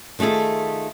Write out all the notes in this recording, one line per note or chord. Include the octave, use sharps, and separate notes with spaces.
D#3 A3 F4 G#4 A4